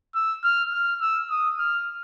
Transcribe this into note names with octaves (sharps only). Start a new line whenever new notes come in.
E6
F6
F6
E6
D#6
F6